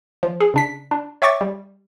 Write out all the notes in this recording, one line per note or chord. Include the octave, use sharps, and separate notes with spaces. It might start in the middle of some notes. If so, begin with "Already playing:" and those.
F3
G#4
C#3 D4 B6
D4
C#5 E5 G5 C#6 D6 A6
G3